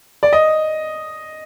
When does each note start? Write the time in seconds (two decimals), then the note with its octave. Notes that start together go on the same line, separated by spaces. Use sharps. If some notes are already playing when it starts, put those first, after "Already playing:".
0.23 D5
0.33 D#5